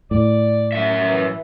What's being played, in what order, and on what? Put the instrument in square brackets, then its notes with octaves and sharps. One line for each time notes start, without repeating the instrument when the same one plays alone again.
[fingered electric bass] A2 [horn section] D5
[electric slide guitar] F#2 E5
[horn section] E3